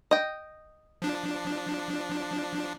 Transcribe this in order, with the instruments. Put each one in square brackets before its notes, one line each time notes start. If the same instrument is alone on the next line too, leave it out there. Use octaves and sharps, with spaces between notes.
[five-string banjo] D#5 G5
[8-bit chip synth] F3 D4